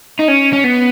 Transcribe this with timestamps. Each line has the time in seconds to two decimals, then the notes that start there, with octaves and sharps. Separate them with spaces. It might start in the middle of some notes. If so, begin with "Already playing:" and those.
0.19 D#4
0.28 C#4
0.53 C#4
0.64 B3